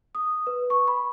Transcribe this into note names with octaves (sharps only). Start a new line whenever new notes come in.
D#6
B4
C#6
B5